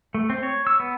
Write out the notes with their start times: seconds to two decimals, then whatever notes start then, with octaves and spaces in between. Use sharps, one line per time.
0.14 A3
0.30 C4
0.43 C#5
0.67 E6
0.80 B3